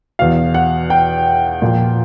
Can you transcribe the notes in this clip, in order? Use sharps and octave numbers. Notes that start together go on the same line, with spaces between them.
E2 B2 F5
F#5
G5
A#2 F3